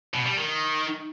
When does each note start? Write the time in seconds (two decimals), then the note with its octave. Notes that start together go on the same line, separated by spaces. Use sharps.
0.14 B2
0.25 G3
0.37 D#3